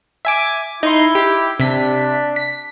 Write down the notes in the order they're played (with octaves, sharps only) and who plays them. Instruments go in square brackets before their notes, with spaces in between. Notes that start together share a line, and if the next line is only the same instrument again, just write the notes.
[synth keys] E5 G#5 D6
[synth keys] D#4 C6 [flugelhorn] E4
[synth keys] G4
[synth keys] C3 B6 [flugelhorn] D4
[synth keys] B6